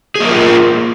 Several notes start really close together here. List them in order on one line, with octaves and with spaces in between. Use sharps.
G#4 A#3 A#4 F4